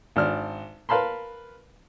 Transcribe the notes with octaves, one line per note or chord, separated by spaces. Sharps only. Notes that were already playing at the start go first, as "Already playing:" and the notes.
G#1 D4 F6
A#4 B4 F5 A5 B5 C6